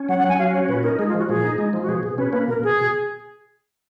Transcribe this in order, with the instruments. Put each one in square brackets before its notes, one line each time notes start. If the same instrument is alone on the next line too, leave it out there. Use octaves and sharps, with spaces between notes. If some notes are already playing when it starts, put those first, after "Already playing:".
Already playing: [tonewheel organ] C#4
[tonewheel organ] F#3 [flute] F#5
[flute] F#5
[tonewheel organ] F#3 [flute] G#5
[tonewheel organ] F#4 [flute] F5
[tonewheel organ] C#4 [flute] C#5
[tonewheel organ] A#2 [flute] B4
[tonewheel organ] D#4 [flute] A#4
[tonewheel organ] G#3 [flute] G#4
[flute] F4
[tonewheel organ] F3 [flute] F#4
[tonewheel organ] A#2 [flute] G#4
[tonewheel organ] D#4
G#3
F3
[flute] F#4
[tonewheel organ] B2 [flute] G#4
[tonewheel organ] B2 [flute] G#4
[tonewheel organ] C#4 [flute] B4
[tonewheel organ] A#3 [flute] B4
[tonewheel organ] B2 [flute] A#4
[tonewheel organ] B2 [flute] G#4